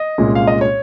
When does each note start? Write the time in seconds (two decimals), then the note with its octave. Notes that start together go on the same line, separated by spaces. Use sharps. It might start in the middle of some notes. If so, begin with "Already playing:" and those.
Already playing: D#5
0.18 C2 A#2 G#3 C#4
0.35 F5
0.47 D#5
0.61 C#5